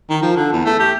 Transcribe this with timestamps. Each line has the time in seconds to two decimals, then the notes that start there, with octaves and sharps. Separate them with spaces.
0.10 D#3
0.22 F3
0.36 D3
0.53 E2
0.65 A3
0.80 G4